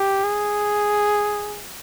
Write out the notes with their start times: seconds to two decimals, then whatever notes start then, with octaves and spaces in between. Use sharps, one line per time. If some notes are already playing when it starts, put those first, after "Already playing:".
Already playing: G4
0.24 G#4